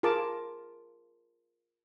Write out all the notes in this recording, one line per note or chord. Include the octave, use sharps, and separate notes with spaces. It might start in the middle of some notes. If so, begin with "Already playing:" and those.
F4 G#4 A#4 A5 D6